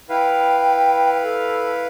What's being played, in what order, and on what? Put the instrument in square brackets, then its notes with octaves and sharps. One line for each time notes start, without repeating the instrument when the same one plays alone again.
[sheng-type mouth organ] E4 B4 F5 [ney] G5
[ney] A4